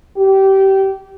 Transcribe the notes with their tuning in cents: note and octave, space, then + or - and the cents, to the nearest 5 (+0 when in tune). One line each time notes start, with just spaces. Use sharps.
G4 -20